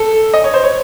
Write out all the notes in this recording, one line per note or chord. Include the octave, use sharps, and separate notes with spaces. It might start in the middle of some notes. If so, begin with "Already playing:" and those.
Already playing: A4
D#5
C#5
C5
C#5